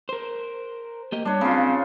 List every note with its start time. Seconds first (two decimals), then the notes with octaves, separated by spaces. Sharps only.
0.09 A#4 C5
1.12 A#3 G4 D#5
1.25 G3 D4 C#5
1.41 C#3 C4 F4